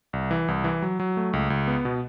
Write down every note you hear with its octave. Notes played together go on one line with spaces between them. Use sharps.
C2
E3
C2
E3
F#3
F#3
A3
C#2
C#2
B3
B2